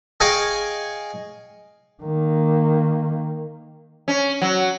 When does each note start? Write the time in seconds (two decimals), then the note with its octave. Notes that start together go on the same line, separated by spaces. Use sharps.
0.20 G#4 C#5 D#5 F5 G5 G#5
2.03 D#3 A#3
4.08 C#4
4.41 F#3